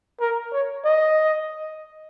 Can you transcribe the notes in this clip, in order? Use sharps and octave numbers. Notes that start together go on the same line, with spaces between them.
A#4
C#5
D#5